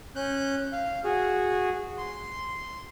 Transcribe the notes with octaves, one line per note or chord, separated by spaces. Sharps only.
C#4 F#6 G6
F5
F#4 G#4
C6